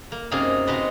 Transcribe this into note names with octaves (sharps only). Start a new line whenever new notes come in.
A#3
F#2 C3 A#3 D#4 G#4 A#4
C3 G#3 D#4 F#4 B4 D#5